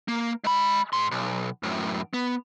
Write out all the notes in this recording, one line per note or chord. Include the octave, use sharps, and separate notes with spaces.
A#3
G#3 B5
G#2 C6
B1
F#2 A2
B3